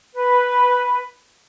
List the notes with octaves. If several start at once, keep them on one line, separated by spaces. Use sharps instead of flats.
B4